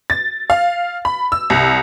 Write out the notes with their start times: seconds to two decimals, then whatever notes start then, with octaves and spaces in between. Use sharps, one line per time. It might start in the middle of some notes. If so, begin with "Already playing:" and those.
0.10 A6
0.50 F5
1.05 B5
1.32 E6
1.50 C2